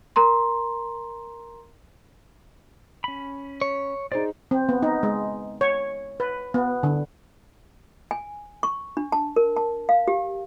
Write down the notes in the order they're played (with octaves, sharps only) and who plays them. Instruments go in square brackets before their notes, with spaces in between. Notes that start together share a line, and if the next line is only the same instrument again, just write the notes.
[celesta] A#4 A#5 C6
[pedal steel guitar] C#4 B5
[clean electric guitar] C#5
[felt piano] D#4 G#4 C5 [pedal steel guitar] D5
[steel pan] C4
B3
D#4
G#3
C#5
B4
B3
D3
[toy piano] G#5
C#6
D4
A5
A#4
A5
F5
G4